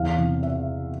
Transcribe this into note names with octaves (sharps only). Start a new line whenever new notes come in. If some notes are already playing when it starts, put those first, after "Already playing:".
Already playing: E2 F5
C3 E3
E5